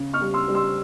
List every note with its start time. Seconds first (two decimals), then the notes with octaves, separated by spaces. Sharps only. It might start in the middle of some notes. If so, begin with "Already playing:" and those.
Already playing: C#3
0.13 C#6 F6
0.21 G3
0.34 C6 E6
0.48 G3
0.55 C6 E6